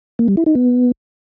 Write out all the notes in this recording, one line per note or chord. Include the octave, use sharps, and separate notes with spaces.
A#3
G3
E4
D#4
B3